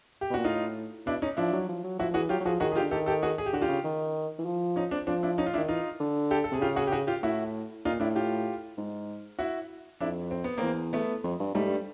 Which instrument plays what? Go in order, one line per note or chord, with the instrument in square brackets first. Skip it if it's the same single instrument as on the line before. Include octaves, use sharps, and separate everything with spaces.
[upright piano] G4
[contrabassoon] B2
[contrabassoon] A#2 [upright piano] F#4
[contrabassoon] A2 [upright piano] D#4 F4
[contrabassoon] B2 [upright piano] D4 E4
[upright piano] C#4 D#4
[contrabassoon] F3 [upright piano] D4 E4
[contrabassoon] F#3
F3
F#3
[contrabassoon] F3 [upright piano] E4 F#4
[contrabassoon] F3
[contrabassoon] E3 [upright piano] F#4 G#4
[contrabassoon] F#3 [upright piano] F4 G4
[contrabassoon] F#3
[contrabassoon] F3 [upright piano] F#4 G#4
[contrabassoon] D#3 [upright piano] F#4 G#4
[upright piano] G#4
F4 G4
[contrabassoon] D3
[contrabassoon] D#3 [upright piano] G4 A4
[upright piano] G4 A4
F#4 G#4
G#4
G4
[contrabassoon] D3 [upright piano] F#4
[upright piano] F4 G4
[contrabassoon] C#3
D#3
E3
F3
[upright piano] C#4 D#4
C4 D4
[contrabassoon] F3 [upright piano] C4 D4
[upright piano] D4 E4
C#4 D#4
F4
D4 E4
[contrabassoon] D#3
[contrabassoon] E3 [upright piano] D#4 F4
[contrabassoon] D3
[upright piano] G4 A4
A4
[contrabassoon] C3 [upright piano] G#4
[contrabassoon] C#3 [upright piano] F4 G4
[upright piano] F#4 G#4
G4
F#4 G#4
F4 G4
[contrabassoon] A2 [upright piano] E4 F#4
[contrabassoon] A#2 [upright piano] D#4 F4
[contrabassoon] A2 [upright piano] D4 E4
[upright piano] F4 G4
[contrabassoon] G#2
[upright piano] E4 F#4
[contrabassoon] F2 [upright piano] D4 E4
[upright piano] C4
B3
[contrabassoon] E2 [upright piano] A#3 C4
[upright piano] A3 B3
[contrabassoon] F2
G2
[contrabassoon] G#2 [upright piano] G3 A3
[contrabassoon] G2